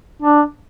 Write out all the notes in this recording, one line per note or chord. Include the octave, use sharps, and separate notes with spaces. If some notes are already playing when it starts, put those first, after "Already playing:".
D4